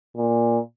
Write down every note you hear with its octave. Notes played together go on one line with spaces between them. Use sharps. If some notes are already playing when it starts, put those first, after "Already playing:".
A#2